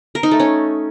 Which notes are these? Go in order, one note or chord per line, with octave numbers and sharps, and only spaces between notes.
A#4
D#4
A3
C#4